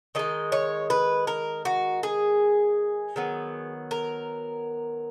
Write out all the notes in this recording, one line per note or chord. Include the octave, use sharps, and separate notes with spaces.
D#3 G#3 D#4 D#5
C#5
B4
A#4
F#4
G#4
D#3 F#3 B3
A#4